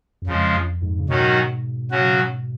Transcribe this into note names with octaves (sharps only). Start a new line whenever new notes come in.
F#2
F2 C#3 F3 G#3
F2
F2 G#2
C#3
G#2 B2 D#3 F#3 C#4 F#4
C#3 F#3 C#4 F#4